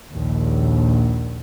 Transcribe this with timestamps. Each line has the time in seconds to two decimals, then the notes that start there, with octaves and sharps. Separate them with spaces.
0.11 A#1 D#2